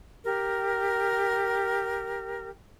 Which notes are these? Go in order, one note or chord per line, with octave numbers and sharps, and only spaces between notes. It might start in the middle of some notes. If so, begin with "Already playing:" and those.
G4 A#4